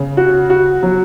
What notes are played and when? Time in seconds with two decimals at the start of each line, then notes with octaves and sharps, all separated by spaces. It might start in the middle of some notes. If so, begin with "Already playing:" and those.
Already playing: C#3
0.17 F#4
0.50 F#4
0.83 F#3